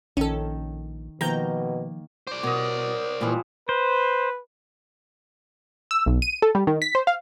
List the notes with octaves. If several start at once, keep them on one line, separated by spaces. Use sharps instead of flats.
A#1 D#3 C#4 A4
B2 D#3 F3 A#3 A#5 G6
C5 D5 D6
B2 A#4 C#5 D#5
A#2 E3 F3 G3 G#3
B4 C5
E6
B1
D#7
A4
G3
D#3
B6
C5
F5